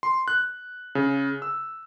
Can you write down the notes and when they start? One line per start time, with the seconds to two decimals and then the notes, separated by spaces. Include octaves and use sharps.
0.03 C6
0.28 F#6
0.95 C#3
1.42 E6